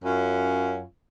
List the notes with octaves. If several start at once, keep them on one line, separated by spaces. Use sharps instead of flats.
F#2 C#4 F4